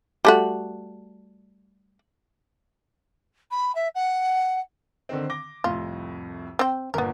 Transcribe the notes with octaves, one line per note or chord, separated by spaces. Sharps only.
G3 A3 F#4
B5
E5
F#5
D3 D#3 C4
D6 A#6 G7
C2 F2 A2 F4
C4 G5
G1 A#2 B3 A#4